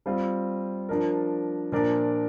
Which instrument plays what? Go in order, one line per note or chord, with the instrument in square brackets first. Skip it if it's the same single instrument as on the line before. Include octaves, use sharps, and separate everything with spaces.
[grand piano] G3 C4 F4
F3 D4 A#4
A#2 F3 D4 A#4 D5